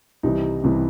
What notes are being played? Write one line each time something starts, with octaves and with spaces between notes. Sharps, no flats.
C2 C3 E3 D#4
C2 C3 E3